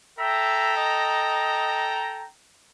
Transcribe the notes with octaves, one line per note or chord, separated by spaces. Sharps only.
A4 E5 G5 A#5
D#5